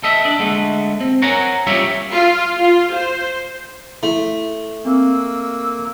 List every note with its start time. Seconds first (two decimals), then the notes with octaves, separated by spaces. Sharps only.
0.03 A4 D#5 E5
0.25 D4
0.39 D3 G#3 A3
1.00 C4
1.22 A#4 C#5 F#5 G#5 A#5
1.67 G3 C#4 F4 G4 C#5 E5
2.12 F4
2.58 F4
2.93 C5
4.03 A3 E4
4.85 A#3 C4 E6